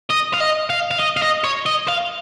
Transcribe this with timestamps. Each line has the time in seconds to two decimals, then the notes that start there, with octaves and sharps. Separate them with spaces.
0.10 D#5
0.33 F5
0.40 D#5
0.70 F5
0.91 F5
0.99 D#5
1.17 F5
1.22 D#5
1.44 C#5
1.66 D#5
1.89 F5